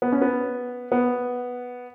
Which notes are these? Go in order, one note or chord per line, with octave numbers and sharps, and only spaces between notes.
B3
C#4
B3
B3